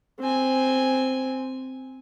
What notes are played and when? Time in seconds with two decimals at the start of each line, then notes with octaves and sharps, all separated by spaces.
0.20 C4 G#5